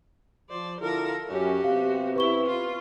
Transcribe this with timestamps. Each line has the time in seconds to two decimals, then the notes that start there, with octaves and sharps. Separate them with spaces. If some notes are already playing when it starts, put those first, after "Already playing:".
0.50 F3 C5 D5
0.81 D3 E4 F4 A4 A#4
1.29 F#2 C#4 F#4 G4
1.64 C3 B3 C4 F5
2.16 E4 B4 C#6 G7
2.46 F4